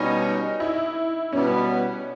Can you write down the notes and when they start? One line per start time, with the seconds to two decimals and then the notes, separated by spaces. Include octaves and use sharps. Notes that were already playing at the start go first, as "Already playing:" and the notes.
Already playing: B2 G3 C#4 D#4
0.60 E4
1.33 B2 G3 B3 C#4